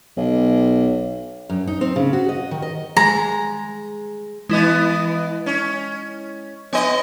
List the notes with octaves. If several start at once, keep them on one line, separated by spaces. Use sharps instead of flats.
B1
F#2
D#4
C4
C#3
F#4
D#5
D#3
D#5
G#3 A#5
E3 G#3 B3 E4 D#5
C#4
B3 C#5 D#5 G#5 C6